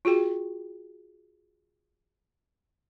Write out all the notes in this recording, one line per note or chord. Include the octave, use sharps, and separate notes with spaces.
F4 F#4 G#4 G5